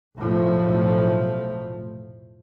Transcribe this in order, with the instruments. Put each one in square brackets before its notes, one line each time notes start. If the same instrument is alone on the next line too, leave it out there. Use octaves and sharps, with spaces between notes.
[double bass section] F1 B1 A2 F3 A3